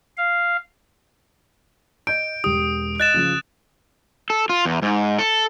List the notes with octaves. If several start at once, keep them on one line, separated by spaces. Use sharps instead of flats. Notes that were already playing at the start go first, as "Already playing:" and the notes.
F5
D#5 G6 D7
E1 G4 D#6
D#5 F#6 A6 E7
C#3 F3
A4
F4
E2
G#2
A4